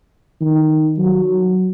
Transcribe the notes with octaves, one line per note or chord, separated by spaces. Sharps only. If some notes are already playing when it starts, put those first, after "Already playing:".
D#3
F#3